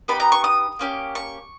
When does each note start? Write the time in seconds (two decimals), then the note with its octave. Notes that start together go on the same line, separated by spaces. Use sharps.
0.08 B3 D#4 G4 B5
0.20 A#5
0.32 C#6
0.44 D#6
0.79 A#3 C#4 G4
1.15 C#6